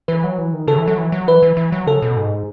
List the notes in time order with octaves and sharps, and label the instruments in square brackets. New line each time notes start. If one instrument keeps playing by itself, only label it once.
[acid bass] E3 [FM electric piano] B4
[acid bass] F#3
E3
D#3
[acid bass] C#3 [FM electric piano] A4
[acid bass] E3
F#3
E3
F#3
[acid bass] E3 [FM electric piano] B4
[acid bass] E3
E3
F#3
[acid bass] C#3 [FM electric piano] A4
[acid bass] B2
G#2